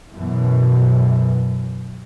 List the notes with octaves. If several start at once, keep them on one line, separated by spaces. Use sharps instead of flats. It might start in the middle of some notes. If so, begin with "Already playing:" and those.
F#2 B2 E3